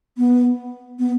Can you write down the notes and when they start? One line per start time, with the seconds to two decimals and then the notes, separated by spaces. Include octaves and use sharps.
0.18 B3
0.99 B3